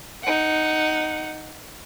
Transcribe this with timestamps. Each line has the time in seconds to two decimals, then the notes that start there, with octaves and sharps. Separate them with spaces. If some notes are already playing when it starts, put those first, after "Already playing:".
0.23 D#4 F#5